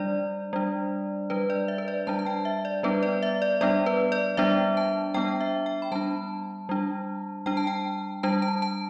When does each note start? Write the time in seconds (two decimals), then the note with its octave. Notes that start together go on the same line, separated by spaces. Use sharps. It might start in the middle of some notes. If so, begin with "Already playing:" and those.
Already playing: G3 D4 D5
0.53 G3 D4
1.30 G3 D4 B4
1.50 D5
1.68 E5
1.78 B4
1.88 D5
2.07 G3 D4 A5
2.19 A5
2.26 G5
2.45 E5
2.65 D5
2.83 G3 B3 D4 B4
3.03 D5
3.23 E5
3.42 D5
3.61 G3 B3 D4 D5
3.86 B4
4.12 D5
4.37 G3 B3 D4 E5
4.77 A5
5.14 G3 B3 D4 G5
5.41 E5
5.66 G5
5.82 B5
5.92 G3 D4 A5
6.69 G3 D4
7.46 G3 D4 G5
7.57 A5
7.67 G5
8.23 G3 D4 A5
8.42 A5
8.62 A5